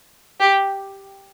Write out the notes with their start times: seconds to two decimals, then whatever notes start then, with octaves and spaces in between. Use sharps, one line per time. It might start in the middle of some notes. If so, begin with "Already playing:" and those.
0.40 G4